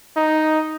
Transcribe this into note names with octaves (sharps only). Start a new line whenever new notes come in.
D#4